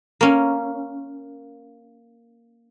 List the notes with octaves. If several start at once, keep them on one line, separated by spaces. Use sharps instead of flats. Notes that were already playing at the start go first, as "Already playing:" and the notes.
A#3 C#4